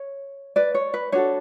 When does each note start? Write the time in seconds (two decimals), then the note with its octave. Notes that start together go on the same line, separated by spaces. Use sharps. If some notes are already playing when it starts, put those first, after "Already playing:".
Already playing: C#5
0.56 B4 D5
0.74 C#5
0.94 B4
1.12 D4 F#4 A4 C#5